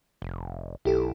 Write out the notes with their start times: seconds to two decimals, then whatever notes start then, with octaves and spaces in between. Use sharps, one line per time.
0.22 F1
0.85 B1 E4 G4 A4